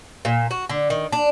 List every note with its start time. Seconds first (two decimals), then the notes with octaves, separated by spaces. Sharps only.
0.25 A#2
0.51 F#4
0.69 D3
0.90 D#3
1.12 D4